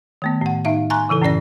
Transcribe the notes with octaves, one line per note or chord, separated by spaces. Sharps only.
D#3 A3 B3
A2 F#5
A2 D#4 E5 F5
G#5 A#5 C6 C#6 F#6
C#3 E3 E4 A4
F#2 A2 C#4 D5 A#6